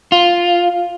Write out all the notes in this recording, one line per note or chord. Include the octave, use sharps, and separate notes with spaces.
F4